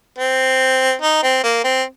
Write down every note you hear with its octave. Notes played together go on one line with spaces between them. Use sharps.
C4
D#4
C4
A#3
C4